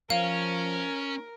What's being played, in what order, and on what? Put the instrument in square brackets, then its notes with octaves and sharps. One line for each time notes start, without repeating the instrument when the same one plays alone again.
[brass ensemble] F3 [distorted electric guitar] C#4 [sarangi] A#4 [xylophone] F5